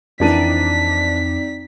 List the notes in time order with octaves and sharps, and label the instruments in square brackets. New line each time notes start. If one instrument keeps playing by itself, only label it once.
[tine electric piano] F2 [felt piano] E3 D4 D#7 [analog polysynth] C4 D#4 D5 [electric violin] B6